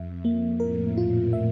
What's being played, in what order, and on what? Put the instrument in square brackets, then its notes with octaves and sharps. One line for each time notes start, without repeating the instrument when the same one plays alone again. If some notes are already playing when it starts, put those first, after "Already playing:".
Already playing: [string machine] F2 [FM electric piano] E5
[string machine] F2 [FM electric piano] A#3
[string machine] A2 [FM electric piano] A#4
[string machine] A#2 [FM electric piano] F4
[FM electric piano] E5